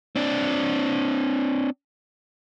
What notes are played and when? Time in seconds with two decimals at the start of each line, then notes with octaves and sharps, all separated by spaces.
0.16 C4 D4